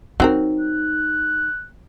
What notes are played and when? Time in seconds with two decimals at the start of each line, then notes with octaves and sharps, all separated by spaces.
0.20 F#3 C4 D#4 A#4
0.60 F#6